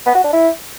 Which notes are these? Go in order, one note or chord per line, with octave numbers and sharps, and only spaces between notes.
B3
F#4
D4
E4